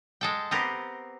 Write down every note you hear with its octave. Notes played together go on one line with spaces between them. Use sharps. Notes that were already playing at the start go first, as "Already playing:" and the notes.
G#3 A4 G5
B3 C4 G4 A#4